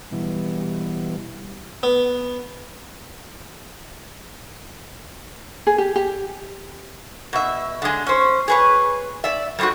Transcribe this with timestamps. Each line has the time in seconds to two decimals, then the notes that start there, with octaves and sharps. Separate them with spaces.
0.12 B2 E3 G3
1.83 B3
5.67 G#4
5.78 G4
5.96 G4
7.33 B2 E5
7.82 D3 G#3
8.07 C#4 C5
8.48 G#4 B4 C#5
9.24 D5 E5
9.59 G3 A3 B3 C4 F#4